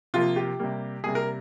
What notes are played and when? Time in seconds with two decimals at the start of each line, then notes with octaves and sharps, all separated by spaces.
0.14 C3 F3 A#3 F4
0.36 G4
0.59 C3 G3 A#3
1.04 C3 G3 A#3 G#4
1.15 A#4